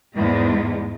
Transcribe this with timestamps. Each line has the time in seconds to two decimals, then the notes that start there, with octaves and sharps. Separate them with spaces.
0.16 E2 G#2 G#3